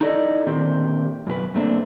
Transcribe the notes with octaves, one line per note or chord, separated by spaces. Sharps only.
D#4 E4 A4 D5 D#5
A#2 D3 D#3 C4 G4
F#2 B2 G4 B4
G2 D3 A3 A#3 C4 D4